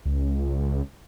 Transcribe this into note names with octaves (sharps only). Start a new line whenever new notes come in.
C#2